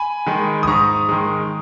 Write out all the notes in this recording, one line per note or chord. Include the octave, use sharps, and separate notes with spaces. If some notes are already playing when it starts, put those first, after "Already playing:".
Already playing: G#5 B5
D#3 G#3
D#6
G#2 A#5 C#6
D#3 G#3